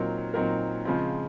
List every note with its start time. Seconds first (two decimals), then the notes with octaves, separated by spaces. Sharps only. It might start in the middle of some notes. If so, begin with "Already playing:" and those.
Already playing: A#2 F#3 C4 D#4 A#4
0.34 A#2 F#3 C4 D#4 A#4
0.85 C#3 F3 G#3 C4